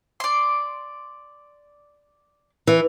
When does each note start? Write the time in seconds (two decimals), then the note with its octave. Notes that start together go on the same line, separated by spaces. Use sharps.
0.20 D5 C6
2.67 E3